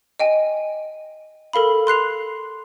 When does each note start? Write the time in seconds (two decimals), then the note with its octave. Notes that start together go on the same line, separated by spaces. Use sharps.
0.19 D#5 G5 G#5
1.53 A4 A#4 F5 B5
1.87 C6 F#6 C7 F7